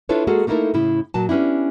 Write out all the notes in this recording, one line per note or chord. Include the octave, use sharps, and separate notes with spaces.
D4 E4 F4 A4 B4 C#5
G#3 A#3 F#4 G#4 A4
A3 A#3 D#4 E4 A4 A#4
A2 C#3 E4
A#2 F#3 A5
G3 B3 C#4 D4 E4